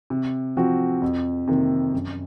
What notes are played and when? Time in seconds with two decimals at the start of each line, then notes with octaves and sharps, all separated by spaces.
0.10 C3
0.57 F3 C4 F#4
1.02 F2
1.48 C3 D#3 A#3
1.93 F#2